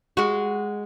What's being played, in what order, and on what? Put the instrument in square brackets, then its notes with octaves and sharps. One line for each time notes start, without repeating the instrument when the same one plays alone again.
[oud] G#3 F#4